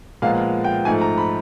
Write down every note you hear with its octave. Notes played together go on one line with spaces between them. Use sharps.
A#2 F3 G#3 B3 F5
G5
G#2 F3 A3 G#5
A#5
B5